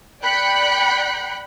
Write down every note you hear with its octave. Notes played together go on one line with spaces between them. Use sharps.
D5 G5 B5 F#6 C#7